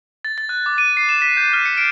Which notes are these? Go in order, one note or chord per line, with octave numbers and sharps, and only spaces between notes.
A6
A6
F#6
D6
D#7
C7
E7
B6
G6
F6
C#7
D7